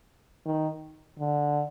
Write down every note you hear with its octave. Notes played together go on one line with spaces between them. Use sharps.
D#3
D3